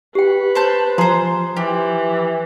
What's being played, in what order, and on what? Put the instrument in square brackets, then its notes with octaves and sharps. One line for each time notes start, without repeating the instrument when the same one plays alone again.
[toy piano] G4 G5 [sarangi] B4
[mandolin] C5 A5 G6
[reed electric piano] F3 C6 [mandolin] G#4 C5 [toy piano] A#5
[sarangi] E3 [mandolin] G4